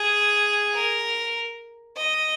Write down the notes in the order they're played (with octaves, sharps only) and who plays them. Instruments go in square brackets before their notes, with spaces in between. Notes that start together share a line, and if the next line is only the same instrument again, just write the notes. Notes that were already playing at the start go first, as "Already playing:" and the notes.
Already playing: [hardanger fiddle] G#4
A#4
D#5